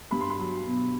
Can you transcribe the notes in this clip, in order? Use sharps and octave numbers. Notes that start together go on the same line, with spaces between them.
G2 B5
C6
B5
F#3
B2